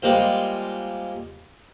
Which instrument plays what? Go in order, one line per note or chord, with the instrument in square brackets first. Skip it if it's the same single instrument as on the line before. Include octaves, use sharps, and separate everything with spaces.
[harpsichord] G3 G#3 A#3 F4 C5